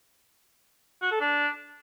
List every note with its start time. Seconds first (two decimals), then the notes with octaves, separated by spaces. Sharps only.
1.02 F#4
1.11 A4
1.21 D4